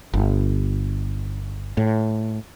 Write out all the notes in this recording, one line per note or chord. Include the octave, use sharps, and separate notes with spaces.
G1
A2